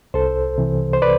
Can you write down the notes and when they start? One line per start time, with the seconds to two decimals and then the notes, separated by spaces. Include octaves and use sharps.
0.14 C2 A4 C5
0.58 C3 E3
0.93 C5
1.02 B4 D5